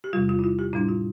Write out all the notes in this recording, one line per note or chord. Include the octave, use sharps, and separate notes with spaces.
G4
E2 C3 G3 F4
F4
E4
F4
G4
A2 G3 D4 E4
F4